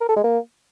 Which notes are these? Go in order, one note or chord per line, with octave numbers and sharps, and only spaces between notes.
A#4
A4
G#3
A#3